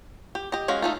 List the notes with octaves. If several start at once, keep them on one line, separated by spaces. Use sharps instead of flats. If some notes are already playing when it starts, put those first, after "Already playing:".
G4
G4 D#5
G#3 C#4 F#4 F5
A3 D#4 F4